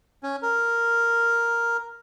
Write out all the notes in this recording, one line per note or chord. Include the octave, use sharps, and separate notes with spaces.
C#4
A#4